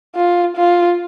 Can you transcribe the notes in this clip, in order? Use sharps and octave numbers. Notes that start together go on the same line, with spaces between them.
F4
F4